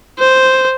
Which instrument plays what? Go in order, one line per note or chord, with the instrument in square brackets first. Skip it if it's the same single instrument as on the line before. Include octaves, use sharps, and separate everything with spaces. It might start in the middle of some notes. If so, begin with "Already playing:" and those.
[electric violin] C5